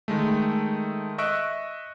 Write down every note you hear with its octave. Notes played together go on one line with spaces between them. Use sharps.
D#3 G#3 A3
D#5 E5 C#6 E6 F#6 D7